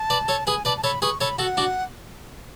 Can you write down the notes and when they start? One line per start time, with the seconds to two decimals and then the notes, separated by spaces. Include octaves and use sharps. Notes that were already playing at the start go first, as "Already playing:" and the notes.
Already playing: A5
0.10 B4 D5
0.28 A4 C#5
0.47 G#4 B4 G#5
0.65 B4 D5 A5
0.77 A5
0.84 A4 C#5 B5
1.02 G#4 B4 C#6
1.21 A4 C#5 B5
1.39 F#4 A4 F#5
1.57 D4 F#4